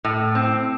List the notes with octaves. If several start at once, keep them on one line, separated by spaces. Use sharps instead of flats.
A2
C4